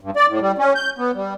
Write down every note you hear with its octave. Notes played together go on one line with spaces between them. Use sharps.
G2
D5
A2
G3
C#4
G6
B3
G3